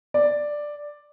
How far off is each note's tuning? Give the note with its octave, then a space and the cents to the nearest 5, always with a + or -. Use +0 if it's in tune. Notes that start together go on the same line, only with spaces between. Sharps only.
D5 +5